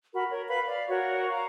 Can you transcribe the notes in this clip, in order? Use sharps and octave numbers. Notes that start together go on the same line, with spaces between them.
F#4 A#4 B5
A#4 C#5
B4 F5 B5
D5 F5
F#4 A#4 C#5 C#6
F5 A#5